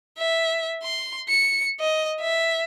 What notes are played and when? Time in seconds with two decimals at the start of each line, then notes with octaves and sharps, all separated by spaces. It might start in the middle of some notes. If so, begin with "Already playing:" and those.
0.18 E5
0.83 C6
1.28 C#7
1.80 D#5
2.20 E5